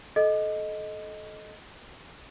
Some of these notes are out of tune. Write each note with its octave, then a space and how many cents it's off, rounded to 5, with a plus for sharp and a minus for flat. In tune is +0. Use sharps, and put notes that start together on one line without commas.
A4 -25 D#5 +0